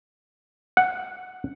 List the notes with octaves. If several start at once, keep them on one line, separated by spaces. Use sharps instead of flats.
F#5